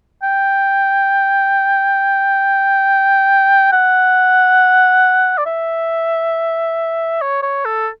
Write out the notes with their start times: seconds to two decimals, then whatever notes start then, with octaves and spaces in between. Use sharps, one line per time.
0.23 G5
3.72 F#5
5.38 D5
5.46 E5
7.22 C#5
7.43 C#5
7.65 A4